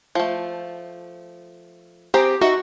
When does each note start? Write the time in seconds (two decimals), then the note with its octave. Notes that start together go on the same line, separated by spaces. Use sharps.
0.15 F3 A3
2.14 C4 G4 G#4 A#5
2.41 D#4 F#4 E5